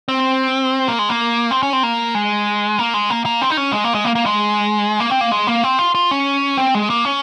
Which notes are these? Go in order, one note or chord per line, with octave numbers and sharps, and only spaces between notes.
C4
A#3
G#3
A#3
C4
C#4
C4
A#3
G#3
A#3
G#3
A#3
A#3
C4
D#4
C#4
G#3
A#3
G#3
A#3
A#3
G#3
A#3
C4
A#3
G#3
A#3
C4
F4
F4
C#4
C4
G#3
A#3
C#4